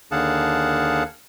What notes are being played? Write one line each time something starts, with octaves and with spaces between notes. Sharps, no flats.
D#2 D3 G#4 F5 F#5 A5